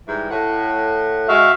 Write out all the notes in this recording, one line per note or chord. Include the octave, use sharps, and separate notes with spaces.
G#2 E3 G3
A2 F#5
G#3 F#4 E5 F5